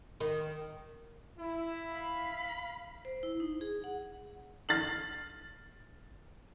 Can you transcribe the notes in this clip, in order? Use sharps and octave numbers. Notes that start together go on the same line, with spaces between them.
D#3
E4
F5 B5
C5
E4
D#4
G#4
F#5
F6 A6 C7 F#7